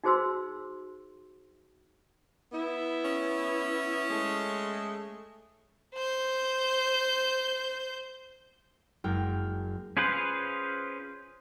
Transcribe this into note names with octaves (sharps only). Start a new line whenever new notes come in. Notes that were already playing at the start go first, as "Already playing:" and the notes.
D#4 F#4 G#4 C5 C6 E6
B3 E4
C#4
G#3 A3
C5 G6
F#1 G#3 A#4 G5 F6
C#4 F4 G#4 B4 C5